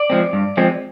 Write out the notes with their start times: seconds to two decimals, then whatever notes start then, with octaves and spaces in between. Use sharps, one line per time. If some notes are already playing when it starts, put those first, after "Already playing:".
Already playing: D5
0.10 F3 G#3 C4
0.33 G2
0.57 F3 G#3 C4